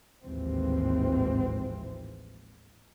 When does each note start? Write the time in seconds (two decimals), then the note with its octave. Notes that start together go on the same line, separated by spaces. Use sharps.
0.24 A1 D#2 G#2 E3 F3 C4